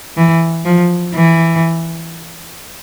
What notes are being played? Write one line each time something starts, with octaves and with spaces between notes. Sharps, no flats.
E3
F3
E3